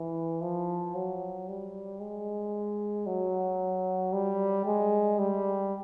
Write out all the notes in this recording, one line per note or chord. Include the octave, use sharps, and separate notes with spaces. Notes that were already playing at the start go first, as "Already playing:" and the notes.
Already playing: E3
F3
F#3
G3
G#3
F#3
G3
G#3
G3